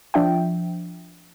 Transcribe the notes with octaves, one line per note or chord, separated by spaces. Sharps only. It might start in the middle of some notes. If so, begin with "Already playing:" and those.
F3 D4 E5 G5